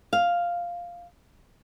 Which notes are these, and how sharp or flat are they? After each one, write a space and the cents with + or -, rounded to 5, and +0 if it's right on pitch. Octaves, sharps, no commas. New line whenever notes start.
F5 +0